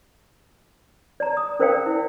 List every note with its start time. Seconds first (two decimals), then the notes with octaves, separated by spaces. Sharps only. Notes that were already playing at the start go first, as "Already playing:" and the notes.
1.20 D5 A#5
1.37 D#6
1.59 C#4 A#4 C5 D5 F5 G5
1.86 E4